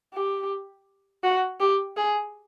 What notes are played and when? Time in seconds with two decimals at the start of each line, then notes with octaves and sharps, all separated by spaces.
0.14 G4
1.23 F#4
1.60 G4
1.97 G#4